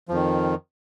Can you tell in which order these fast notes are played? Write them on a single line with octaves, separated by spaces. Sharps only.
F3 F2 D#3